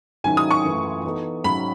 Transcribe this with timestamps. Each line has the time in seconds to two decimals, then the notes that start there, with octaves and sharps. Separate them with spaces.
0.24 G#2 D#3 F#3 C#4 E4 G#5
0.37 D#6
0.51 C#6
0.64 F#2 E3 A3
1.05 E3 B3 D#4 A4
1.44 G#2 F#3 C#4 B5